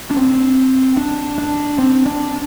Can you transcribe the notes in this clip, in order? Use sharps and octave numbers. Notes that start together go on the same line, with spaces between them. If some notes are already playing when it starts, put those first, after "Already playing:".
D4
C4
D4
D4
C4
D4